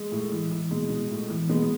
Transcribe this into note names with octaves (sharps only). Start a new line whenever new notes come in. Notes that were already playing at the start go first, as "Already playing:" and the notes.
Already playing: G#3
A2
E3
E3
B2 G#3
B2
A2
E3
B2 G#3 B3